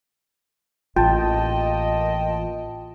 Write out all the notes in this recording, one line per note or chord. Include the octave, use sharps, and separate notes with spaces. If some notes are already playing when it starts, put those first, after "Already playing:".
A1 A#3 F4 D#5 G5 A5